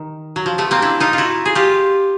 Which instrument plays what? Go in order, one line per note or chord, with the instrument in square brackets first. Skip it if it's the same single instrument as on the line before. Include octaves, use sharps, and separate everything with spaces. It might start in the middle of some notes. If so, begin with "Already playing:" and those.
Already playing: [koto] D#3
F#3
F3
A3 B3
A#3 C4
D4 E4
D#4 F4
F4
E4 F#4
G#4
F4 G4